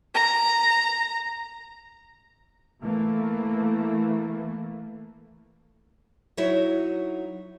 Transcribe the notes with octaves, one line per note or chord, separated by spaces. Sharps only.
A#5
E3 A3 A#3
F#3 D#4 E4 F#4 C#5